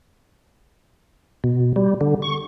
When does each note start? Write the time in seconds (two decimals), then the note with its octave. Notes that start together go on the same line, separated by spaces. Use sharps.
1.44 B2
1.76 G3
2.01 D3
2.22 C#6